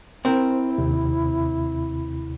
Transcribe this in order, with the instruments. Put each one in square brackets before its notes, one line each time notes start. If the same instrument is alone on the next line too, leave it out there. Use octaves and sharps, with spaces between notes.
[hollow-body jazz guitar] C4 A#4 [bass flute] E4 [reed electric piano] C5
[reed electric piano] D#2 C3